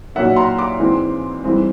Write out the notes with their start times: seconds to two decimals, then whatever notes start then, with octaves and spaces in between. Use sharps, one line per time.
0.15 A#2 F#3 A#3 D#4 E5 F#5
0.36 A#5 C6
0.58 C6 D6
0.79 G#2 E3 G#3 C4
1.44 G2 E3 G#3 C4 D#4